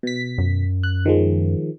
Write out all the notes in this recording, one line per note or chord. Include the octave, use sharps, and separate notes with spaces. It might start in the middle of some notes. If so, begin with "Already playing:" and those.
B2 B6
F#2
F#6
D#3 F3 G#3